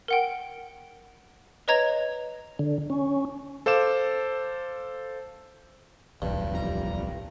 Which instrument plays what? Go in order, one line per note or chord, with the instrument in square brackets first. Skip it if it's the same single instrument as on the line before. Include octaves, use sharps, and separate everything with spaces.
[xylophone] A#4 F#5 G5
B4 C#5 D#5 A#5 G#6 F7
[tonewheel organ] D3
C#4
[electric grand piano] A4 C5 F5 D6 E7
[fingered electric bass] D1 B1 E2 [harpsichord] G2
[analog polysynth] F2 G3 A#5